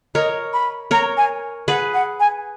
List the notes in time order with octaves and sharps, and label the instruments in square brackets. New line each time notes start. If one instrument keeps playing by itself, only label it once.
[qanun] A#4 C#5 [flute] D#5
[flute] B5
[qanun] A#4 C#5 [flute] A#5
[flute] G#5
[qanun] G#4 B4 [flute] F#5
[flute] F#5
G#5